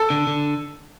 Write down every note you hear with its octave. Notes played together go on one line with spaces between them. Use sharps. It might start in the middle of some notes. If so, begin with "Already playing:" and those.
Already playing: A4
D3
D3